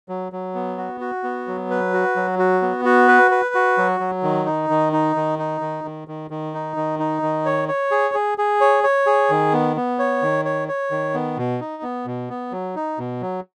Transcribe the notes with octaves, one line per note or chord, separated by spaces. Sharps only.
F#3
F#3
B3
F#4
F#4
B3
F#3
B4
F#4
F#3
F#4
B3
F#4
B4
B4
F#4
F#3
F#3
D#3
D#4
D#3
D#4
D#3
D#4
D#3
D#3
D#3
D#3
D#4
D#3
D#4
D#3
C#5
C#5
G#4
G#4
G#4
C#5
C#5
G#4
D#3
B3
B3
C#5
D#3
C#5
C#5
D#3
B3
B2
D#4
B3
B2
B3
F#3
D#4
B2
F#3